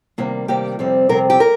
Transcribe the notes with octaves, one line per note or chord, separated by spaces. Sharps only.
C3 D#3 G3 A#3
C3 D#3 G3 A#3 G4
F2 C3 G3 C4
F2 C3 G3 C4 A#4
G4
A#4